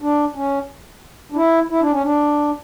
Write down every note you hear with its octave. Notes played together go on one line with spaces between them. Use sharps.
D4
C#4
D4
E4
E4
D4
C#4
D4